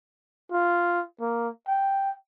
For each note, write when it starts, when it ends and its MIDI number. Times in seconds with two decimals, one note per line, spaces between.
0.52 1.02 65
1.21 1.49 58
1.67 2.12 79